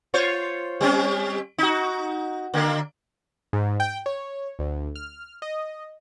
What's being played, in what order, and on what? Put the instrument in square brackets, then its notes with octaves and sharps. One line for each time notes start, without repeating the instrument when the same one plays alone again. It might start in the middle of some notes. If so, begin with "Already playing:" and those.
[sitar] F4 C5 C#5
G3 C4 C#4
D#4 F#4
D3 A#3
[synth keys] G#2
G5
C#5
D2
F6
D#5